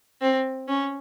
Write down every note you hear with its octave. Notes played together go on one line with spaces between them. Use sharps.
C4
C#4